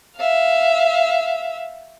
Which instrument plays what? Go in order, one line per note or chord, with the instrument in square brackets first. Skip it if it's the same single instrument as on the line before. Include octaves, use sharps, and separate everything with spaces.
[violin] E5 F5